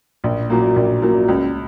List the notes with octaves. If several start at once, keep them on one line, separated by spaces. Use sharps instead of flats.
A#1
A#2 F#3 A#3
A#1
A#2 F#3 A#3
C#2